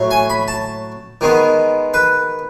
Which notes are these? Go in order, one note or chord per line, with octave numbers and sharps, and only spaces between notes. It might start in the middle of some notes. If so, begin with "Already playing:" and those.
Already playing: A2 F#3 A3
G#5
B5
A5
D#3 G#3 B3
B4